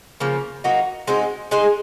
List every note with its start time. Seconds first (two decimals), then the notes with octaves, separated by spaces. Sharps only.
0.20 C#3 F3 A#3
0.64 F#3 A#3 D#4 F#4
1.08 G#3 C4 D#4 F#4
1.51 G#3 D#4 G#4 C5